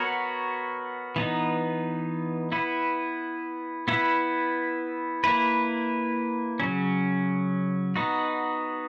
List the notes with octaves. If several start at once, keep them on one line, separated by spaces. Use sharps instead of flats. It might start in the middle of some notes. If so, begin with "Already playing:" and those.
Already playing: B3 F#4 A#4 C#5
E3 B3 D#4
B3 E4 B4
B3 E4 B4
A#3 E4 B4
C#3 F#3 C#4
B3 D#4 F#4